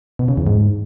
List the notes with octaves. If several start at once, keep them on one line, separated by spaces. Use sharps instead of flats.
B2
C#3
E2
G#2